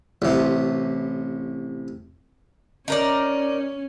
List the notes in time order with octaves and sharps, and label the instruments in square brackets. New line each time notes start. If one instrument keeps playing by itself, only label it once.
[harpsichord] A1 C3
[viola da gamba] C#4 [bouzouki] D#4 A#4 D5